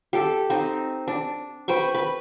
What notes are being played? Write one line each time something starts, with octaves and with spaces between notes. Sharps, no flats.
G4 A4
C4 D#4 C5
D4
B4 C5 G5 C#6
B4